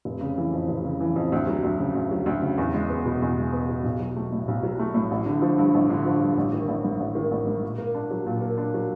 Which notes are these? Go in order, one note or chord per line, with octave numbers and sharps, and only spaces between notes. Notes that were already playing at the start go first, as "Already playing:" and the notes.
F1
C#3
E3
F2
F1
C#3
E3
F2
D2
F#3
D2
C#3
D2
F#3
D2
C#3
E2
G#3
B3
B2
E2
G#3
B3
B2
B1
F#3
A3
A2
B1
F#3
A3
A2
A1
D3
F3
G2
A1
D3
F3
G2
A1
D#3
A1
G#2
A1
D#3
A1
G#2
A#2
A#3
D4
F#3
A#2
A#3
D4
F#3